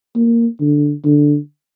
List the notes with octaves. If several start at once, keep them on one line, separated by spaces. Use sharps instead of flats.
A#3
D3
D3